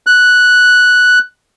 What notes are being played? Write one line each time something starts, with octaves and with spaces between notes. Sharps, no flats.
F#6